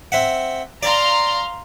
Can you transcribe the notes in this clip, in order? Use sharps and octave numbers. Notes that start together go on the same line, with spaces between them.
C4 E5 F#5
D5 F5 A#5 C6